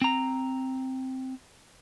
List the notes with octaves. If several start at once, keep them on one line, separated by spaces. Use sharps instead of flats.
C4 A#5